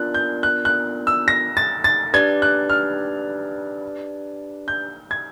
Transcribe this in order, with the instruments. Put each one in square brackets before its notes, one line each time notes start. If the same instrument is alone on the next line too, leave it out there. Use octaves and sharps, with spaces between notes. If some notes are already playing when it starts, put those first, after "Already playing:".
Already playing: [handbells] B3 D4 F4 A#4 D5 [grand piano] F#6
[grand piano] G6
F#6
F#6
E6
A#6
A6
A6
[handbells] D4 G4 B4 D5 [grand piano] G#6
[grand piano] F#6
F6
G6
G#6